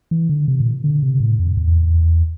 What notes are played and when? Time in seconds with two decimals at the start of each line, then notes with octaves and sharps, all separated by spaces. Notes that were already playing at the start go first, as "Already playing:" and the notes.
0.11 E3
0.29 D3
0.48 C3
0.60 A#2
0.84 D3
1.02 C3
1.20 A2
1.39 F2
1.57 E2